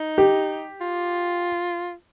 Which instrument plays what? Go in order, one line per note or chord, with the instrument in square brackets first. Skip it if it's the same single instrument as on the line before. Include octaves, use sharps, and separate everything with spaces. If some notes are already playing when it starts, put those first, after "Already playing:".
Already playing: [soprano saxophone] D#4
[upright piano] G4
[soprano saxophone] F4